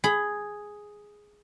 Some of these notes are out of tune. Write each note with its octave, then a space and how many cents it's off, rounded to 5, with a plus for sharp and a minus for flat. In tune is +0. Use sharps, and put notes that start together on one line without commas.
G#4 +0 B5 +25